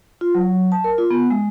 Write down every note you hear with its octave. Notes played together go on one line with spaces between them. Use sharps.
F4
F#3
A5
A#4
F4
B3
G#3